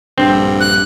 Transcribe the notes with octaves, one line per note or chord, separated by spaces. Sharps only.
A#1 G2 D3 C4
F#6